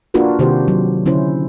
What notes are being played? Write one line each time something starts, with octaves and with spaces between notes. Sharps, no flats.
A#3 D4 F4 F#4 A#4 B4
C3 D#3 A#3 F#4 G4 C5
F#3
D3 C#4 E4 C5